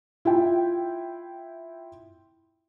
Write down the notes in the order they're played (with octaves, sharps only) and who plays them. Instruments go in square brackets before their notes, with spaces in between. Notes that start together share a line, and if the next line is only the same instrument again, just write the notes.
[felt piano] E4 F4 G5